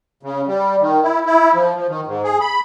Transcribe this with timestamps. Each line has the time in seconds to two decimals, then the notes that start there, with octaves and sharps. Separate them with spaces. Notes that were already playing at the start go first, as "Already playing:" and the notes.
0.23 C#3
0.47 G3
0.81 D#3
1.03 E4
1.26 E4
1.55 F3
1.75 F3
1.89 D#3
2.06 G#2
2.24 G#4
2.41 B5